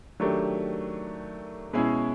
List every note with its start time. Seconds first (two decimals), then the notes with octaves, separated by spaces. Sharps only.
0.20 D#3 F#3 A3 D4 G4
1.73 B2 G#3 C#4 E4 G#4